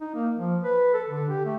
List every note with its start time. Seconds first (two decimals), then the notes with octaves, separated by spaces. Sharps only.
0.01 D#4
0.15 A#3
0.38 F3
0.63 B4
0.94 A4
1.08 D3
1.30 G4
1.45 A3